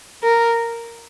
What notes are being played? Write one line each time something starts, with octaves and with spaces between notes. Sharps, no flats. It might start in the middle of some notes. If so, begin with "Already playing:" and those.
A#4